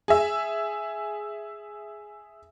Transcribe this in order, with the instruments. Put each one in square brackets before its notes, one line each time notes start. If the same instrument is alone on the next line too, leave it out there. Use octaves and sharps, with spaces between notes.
[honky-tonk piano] G#4 E5